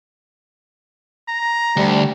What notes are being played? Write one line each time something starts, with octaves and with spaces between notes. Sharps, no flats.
A#5
D2 G3